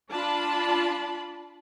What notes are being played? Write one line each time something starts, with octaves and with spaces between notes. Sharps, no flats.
D4 F4 A5 B5